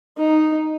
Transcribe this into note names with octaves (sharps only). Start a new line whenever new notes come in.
D#4